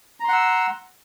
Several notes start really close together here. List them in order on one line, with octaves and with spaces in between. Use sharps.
A#5 C6 F#5 E6